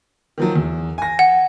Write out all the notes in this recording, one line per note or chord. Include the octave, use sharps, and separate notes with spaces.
D#3 F3 F#3
E2
G#5 A#6
F#5